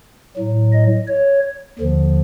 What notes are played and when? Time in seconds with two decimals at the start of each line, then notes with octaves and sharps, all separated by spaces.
0.37 A2 F#3
0.73 D#5
1.08 C#5
1.79 D#2 D3 F3